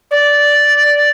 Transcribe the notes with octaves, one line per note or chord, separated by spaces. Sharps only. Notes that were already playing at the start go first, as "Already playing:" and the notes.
D5